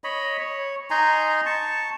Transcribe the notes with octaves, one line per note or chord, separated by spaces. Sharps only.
C#5 D#5 B5
C#5
D#4 G#5 A#5 C6
A5 C#6